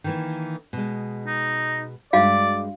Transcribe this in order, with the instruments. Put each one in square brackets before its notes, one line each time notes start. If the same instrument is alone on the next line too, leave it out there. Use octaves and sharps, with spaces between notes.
[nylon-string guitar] D#3 E3 A#3
B2 G#3
[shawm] D#4
[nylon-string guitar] G2 G#3 [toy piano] F#4 F5 [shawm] D5